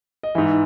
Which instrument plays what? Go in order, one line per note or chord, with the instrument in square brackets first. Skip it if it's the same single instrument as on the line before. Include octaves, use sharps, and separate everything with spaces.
[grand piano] D#5
G#2 E3 E5